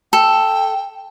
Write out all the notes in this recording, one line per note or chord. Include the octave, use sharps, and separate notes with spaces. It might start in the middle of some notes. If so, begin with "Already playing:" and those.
A4 G5